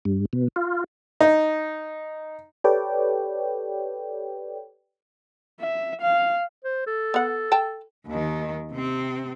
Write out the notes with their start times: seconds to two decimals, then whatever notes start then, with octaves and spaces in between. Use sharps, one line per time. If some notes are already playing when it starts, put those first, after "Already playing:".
0.05 G2
0.33 B2
0.56 F4
1.21 D#4
2.64 G4 A4 B4 C#5 D5 G5
5.61 E5
6.01 F5
6.65 C5
6.87 A4
7.14 B3 F#5
7.52 G5 A5
8.07 D#2 D#3
8.71 C3 C4